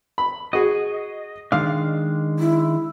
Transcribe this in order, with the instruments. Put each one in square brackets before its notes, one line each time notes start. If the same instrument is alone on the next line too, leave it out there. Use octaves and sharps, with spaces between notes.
[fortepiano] B5
[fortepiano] F#4 G#4 [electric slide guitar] D#5
[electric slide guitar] D#3 G#3 D4 [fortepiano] F5
[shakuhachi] E4